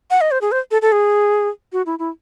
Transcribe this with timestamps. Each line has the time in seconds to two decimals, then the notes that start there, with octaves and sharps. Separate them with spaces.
0.11 F#5
0.21 D#5
0.31 C5
0.42 G#4
0.52 C5
0.71 A4
0.82 A4
0.92 G#4
1.73 F#4
1.86 E4
1.99 E4